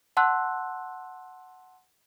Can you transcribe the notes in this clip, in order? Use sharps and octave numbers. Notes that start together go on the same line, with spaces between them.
F#5 A5 C6 E6 F#6